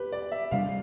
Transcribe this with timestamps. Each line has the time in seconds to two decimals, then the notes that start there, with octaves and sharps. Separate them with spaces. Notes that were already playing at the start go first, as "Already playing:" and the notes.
Already playing: G4 B4
0.12 D5
0.32 E5
0.51 C3 G3 B3 D4 F5